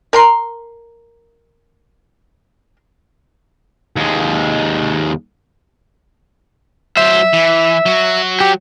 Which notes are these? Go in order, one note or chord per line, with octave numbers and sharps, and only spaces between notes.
A#4 A#5 C6
D#2 G#3
F#3 C5 E5
E3
F#3 F#4
G4